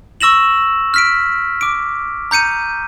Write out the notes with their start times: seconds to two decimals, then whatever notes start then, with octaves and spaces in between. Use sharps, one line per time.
0.21 C#6 E6 A#6 E7 F#7
0.94 F6 B6 D7
1.61 D6 D7
2.31 A#5 G6 C#7 D#7